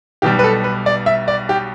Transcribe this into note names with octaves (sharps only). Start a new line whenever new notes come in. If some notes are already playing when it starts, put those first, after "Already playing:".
B1 B2 G3 G4
B4
A4
B4
D5
E5
D5
G4